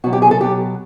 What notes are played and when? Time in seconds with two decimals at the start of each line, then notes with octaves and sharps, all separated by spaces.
0.04 B2 F#3 F#4
0.13 G4
0.22 G#4
0.31 A4
0.40 B2 F#3 G4